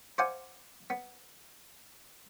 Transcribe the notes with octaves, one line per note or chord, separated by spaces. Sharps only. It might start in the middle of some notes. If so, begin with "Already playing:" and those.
C5 D5 F5 F#5 G#5
B3